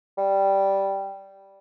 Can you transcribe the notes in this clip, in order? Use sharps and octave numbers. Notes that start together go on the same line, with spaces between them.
G3